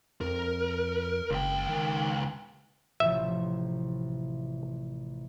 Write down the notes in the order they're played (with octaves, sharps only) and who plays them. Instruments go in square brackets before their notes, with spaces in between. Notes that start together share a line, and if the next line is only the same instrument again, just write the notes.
[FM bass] F2 [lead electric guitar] A#4
[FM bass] F#1 [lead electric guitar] C#2 G5
[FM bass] D#3
[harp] A1 C3 F3 [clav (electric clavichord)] E5